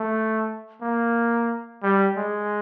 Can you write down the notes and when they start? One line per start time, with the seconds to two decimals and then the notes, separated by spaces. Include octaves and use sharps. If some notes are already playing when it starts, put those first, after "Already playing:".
Already playing: A3
0.82 A#3
1.83 G3
2.17 G#3